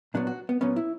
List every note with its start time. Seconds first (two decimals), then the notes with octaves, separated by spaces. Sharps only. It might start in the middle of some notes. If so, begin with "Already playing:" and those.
0.14 A#2 F#3 B3 D4
0.27 F#4
0.49 B3
0.61 A#2 F#3 B3 C#4
0.76 E4